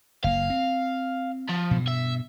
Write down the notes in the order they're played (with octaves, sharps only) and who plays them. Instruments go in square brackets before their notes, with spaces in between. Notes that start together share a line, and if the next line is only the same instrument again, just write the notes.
[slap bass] F#1 A#3 [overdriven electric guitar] F5
[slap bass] C4
[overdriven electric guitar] F3
[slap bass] G2 B2
[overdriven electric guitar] E5